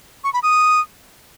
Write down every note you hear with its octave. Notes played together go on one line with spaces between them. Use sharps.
C#6
B5
D#6